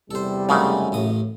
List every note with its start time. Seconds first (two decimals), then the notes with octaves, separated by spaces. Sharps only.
0.11 E2 C3 G3 A4 C5
0.49 F#2 C#3 G#3 A3 D#4
0.92 A1 A2 D#6